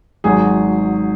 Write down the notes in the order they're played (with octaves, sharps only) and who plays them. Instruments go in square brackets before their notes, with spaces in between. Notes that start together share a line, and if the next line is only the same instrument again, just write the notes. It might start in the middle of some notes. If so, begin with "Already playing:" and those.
[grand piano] G#1 G#2 F#3 G#4